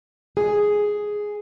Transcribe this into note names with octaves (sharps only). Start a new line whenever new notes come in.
G#4